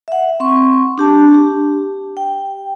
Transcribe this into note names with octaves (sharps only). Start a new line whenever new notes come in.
E5 F#5
C4 C6 C#6
D4 G4 A5
G4
G5